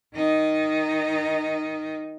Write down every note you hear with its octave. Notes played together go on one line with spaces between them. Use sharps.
D#3 D#4